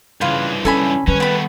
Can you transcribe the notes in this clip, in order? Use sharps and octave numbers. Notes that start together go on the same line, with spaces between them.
G2 C#3 E3 F4 B4
D3 C#4 A4 G#5 B5
D#3 G3 C#4 B4
A3 B3 G5 B5